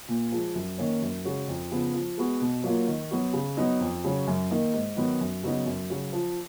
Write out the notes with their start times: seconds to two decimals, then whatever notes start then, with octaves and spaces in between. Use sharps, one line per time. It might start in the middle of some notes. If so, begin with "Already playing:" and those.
0.08 A#2
0.32 F3 G#3
0.55 F#2
0.78 D#3 A#3 C#4
1.02 F#2
1.25 C#3 G#3 C#4 F#4
1.48 F2
1.71 C#3 F3 B3
1.94 F3
2.18 G#3 B3 F#4
2.41 B2
2.64 F#3 A#3 F4
2.88 D#3
3.11 F#3 B3 F#4
3.33 C#3
3.57 F#3 B3 D#4
3.80 F2
4.04 C#3 F#3 C#4
4.27 F#2
4.51 D#3 A#3 D#4
4.74 G#2
4.97 D#3 F#3 B3
5.21 F#2
5.43 C#3 F#3 B3 D#4
5.66 F#2
5.90 C#3 F#3
6.13 F3